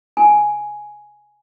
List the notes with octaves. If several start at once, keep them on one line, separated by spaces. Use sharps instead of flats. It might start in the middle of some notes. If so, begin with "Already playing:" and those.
G#5